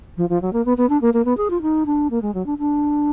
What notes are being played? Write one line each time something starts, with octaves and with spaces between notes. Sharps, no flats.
F3
F3
F#3
A#3
B3
B3
D4
A#3
A#3
B3
G#4
F4
D#4
D4
A#3
G#3
F#3
D4
D4